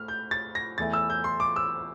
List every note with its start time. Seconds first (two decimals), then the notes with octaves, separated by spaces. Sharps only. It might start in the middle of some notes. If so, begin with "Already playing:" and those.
Already playing: A2 F6
0.08 G6
0.31 A6
0.55 A#6
0.78 E2 E3 A3 E4 A6
0.93 E6
1.10 G6
1.24 C6
1.40 D6
1.56 E6